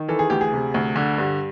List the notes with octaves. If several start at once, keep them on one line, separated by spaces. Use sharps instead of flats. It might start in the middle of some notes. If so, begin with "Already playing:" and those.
Already playing: D#3
E3 A4
G#4
D2 G4
G#4
C3
D2
D3
G2